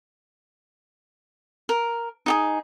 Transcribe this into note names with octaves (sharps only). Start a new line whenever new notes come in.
A#4
D#4 G4 G#4